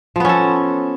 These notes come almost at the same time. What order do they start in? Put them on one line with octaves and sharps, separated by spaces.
F3 B3 C#4 A4